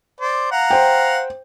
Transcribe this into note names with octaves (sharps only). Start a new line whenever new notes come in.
C5 D5
F5 F#5 A#5
C5 G5